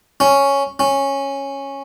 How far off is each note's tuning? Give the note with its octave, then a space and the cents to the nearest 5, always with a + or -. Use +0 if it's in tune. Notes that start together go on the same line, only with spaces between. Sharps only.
C#4 +0
C#4 -10